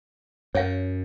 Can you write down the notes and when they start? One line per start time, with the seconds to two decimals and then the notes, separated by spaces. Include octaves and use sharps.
0.55 F#2 C#5 F5